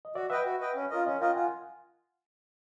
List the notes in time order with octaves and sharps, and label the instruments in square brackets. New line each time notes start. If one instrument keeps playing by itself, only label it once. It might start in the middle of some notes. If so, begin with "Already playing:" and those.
[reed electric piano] D#5
[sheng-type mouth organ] F#4 [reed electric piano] D5 E5
[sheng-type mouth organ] B4 D#5 G5 [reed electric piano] E5 F#5
[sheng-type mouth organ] F#4
B4 D#5 G5
C#4
F4 A#4 D#5
[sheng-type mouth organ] C#4 [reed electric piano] D#5 F5
[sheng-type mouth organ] F4 A#4 D#5 [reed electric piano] F5 G5
[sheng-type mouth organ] F4 [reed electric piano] F#5 G#5